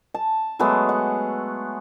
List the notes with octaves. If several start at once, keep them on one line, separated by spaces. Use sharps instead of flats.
A5
F#3 G#3 A3 B3
F#5